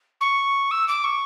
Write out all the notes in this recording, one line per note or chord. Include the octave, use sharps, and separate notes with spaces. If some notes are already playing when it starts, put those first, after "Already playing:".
C#6
E6
D6
C#6